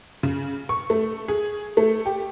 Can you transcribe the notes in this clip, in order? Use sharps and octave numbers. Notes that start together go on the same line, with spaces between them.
C#3
C#6
A3
G#4
A3
G4